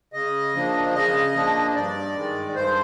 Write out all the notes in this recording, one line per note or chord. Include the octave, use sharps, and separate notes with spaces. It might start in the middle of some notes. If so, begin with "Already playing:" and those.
C#3 D#5
F3 A#3 D4
C#3 D#5
F3 A#3 D4
G2 D5
D#3 G#3
G2 C5